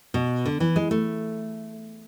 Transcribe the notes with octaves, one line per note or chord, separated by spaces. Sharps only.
B2
D3
E3
G#3
A3